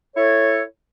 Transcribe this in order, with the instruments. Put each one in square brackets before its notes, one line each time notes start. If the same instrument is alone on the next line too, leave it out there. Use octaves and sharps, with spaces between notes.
[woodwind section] E4 A4 C#5